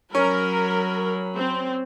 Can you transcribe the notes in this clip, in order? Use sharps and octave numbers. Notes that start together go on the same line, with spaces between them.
F#3 C#4 A#4 B5
C4